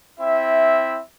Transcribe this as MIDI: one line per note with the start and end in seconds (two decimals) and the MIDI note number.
0.20 0.98 60
0.20 0.98 64
0.20 0.98 76